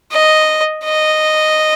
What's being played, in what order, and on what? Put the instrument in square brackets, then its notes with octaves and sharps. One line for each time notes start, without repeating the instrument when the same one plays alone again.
[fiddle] D#5
D#5